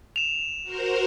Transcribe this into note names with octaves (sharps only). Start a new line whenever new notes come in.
E7 F7
F#4 A#4 C5